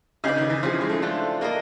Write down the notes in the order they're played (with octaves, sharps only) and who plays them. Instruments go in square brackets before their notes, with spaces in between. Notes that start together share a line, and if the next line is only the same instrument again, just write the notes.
[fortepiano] C#3 [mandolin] D#4 G#4 B4 D5
[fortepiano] D#3
E3
[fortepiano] F3 [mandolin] C#4 E4 G#4
[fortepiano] G#3
A3
[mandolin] D4 F4 A4 C5
[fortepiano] A#3 [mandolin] D4 G4 A#4 D#5